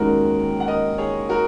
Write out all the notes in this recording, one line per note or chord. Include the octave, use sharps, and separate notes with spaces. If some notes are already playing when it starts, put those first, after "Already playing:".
Already playing: D#2 D#3 G#3 C#4 F#4 A#4
F#5
A#4 D#5
G#4 C#5
F#4 A#4